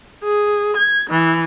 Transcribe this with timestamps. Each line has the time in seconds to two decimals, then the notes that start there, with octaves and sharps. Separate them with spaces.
0.23 G#4
0.76 G#6
1.10 E3